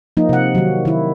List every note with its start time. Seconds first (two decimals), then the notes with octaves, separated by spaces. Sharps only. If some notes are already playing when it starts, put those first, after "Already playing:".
0.17 F3 A#3 D#4
0.29 C3 F#5
0.55 D#3 F#3
0.85 D#3 E4